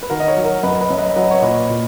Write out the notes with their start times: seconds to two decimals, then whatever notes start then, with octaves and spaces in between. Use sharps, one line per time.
0.03 B4
0.10 D#3 F#4 A#4
0.20 D#5
0.28 A#4 C#5
0.36 F#3
0.45 A#4 C#5
0.63 F#2 B4 D#5
0.81 B4 D#5
0.90 F#2
0.98 B4 D#5
1.16 F#3 B4 D#5
1.31 C#5
1.42 A#2 B4 D#5
1.69 A#2